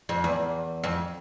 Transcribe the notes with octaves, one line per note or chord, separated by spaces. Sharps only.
F2
E2
F2